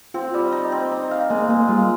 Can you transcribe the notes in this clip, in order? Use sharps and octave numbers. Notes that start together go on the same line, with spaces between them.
C4 F4
G3
D#4
C4
D#4
F5
G#3 A#3
G#3 A#3
G3 F4